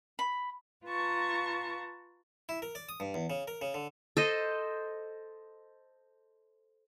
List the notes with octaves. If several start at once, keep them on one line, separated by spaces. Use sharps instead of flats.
B5
F4 B4 A5 A#5 C#6
E4
A#4
D5
D#6
G2
E2
C#3
A#4
C#3
D3
A4 C5 D#5